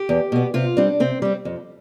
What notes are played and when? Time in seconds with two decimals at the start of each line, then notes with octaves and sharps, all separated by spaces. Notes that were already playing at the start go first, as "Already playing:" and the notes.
Already playing: G4
0.09 E2
0.32 B2 B3
0.54 C3 F4
0.77 G3 C4 D4
1.00 C3 C4
1.22 G3 C4
1.45 F2